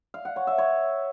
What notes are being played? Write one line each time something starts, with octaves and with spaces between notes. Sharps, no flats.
F5
F#5
C#5
E5
C#5